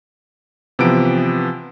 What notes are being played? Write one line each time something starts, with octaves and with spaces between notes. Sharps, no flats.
C3 E3 F3 B3 D7